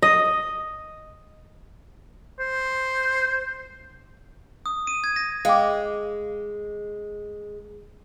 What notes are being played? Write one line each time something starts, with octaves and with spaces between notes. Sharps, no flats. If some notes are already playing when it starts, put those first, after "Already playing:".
D#5
C5
D#6
D#7
G#6
A#6
G#3 F5 G5 D6